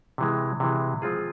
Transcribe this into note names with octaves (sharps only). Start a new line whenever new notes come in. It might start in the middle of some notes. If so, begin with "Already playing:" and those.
C3 E3 G#3
C3 E3 G#3
F3 G#3 C4 F4 G#4